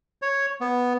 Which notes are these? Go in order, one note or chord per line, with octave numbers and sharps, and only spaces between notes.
C#5
B3